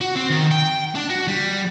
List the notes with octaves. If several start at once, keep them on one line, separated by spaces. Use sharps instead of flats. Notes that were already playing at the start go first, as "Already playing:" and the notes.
F#4
C4
D#3
G5
D4
F#4
G3